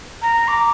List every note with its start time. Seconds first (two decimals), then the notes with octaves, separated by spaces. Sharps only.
0.22 A#5
0.48 D6